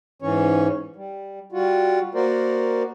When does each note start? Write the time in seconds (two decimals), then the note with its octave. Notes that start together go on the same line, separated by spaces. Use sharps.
0.22 G#2 E3 C#4 C#5
0.96 G3
1.52 G3 F4 F#4
2.15 A#3 F#4 A#4 C5 D5